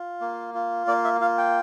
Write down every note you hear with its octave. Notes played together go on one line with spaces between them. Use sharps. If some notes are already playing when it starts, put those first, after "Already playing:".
Already playing: F4
A#3
F4
A#3 D5
E5
F4 F5
G5